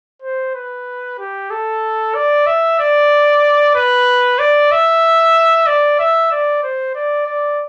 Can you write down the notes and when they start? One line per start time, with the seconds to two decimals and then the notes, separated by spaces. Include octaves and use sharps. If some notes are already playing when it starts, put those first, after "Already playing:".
0.22 C5
0.55 B4
1.19 G4
1.50 A4
2.15 D5
2.46 E5
2.79 D5
3.75 B4
4.39 D5
4.71 E5
5.67 D5
5.99 E5
6.31 D5
6.63 C5
6.95 D5
7.27 D5